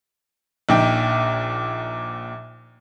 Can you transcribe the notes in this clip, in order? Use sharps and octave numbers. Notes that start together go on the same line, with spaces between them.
A#1 A#2 D#4 G5